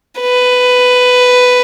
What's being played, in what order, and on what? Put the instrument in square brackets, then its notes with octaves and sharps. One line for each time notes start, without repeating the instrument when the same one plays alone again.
[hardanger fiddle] B4